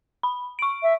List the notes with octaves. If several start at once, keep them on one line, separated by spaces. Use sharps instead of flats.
B5
C#6 D7
E5